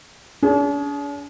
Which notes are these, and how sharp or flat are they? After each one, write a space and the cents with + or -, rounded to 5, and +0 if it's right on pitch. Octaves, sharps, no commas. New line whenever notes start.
D4 -45 G#4 +0